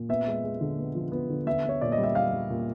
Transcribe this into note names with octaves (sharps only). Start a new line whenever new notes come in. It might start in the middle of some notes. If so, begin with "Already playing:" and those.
Already playing: A#2
B3 E5
G#3
G#3
D3
B3
F3
B3
D3
B3 E5
B3 C#5
A#2 D5
D#5
G3
E5
G3 F5
G3
A#2